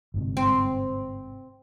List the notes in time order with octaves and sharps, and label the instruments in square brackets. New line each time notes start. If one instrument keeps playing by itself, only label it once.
[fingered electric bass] G1 G#2 C3
[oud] C4